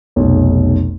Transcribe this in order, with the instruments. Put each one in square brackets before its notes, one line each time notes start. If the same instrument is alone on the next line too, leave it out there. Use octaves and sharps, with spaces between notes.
[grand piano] F1 B1